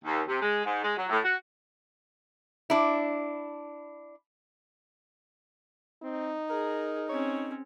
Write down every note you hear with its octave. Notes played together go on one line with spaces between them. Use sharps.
D#2
C3
G#3
G#2
G#3
F#3
A2
F#4
D4 E4
C4 D#4
G#4 A#4
C4 C#4 C#5